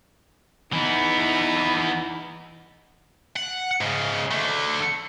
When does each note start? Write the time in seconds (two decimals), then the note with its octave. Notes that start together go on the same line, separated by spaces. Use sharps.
0.73 E3 B3 D#4
3.36 F#5
3.81 G#2 C#3
4.31 D3 A3